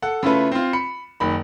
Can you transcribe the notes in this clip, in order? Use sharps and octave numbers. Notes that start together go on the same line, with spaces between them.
A4 F#5
C#3 A3 E4 F4 A4 B4
C4 F4
B5 C#7
F#1 D#3 B5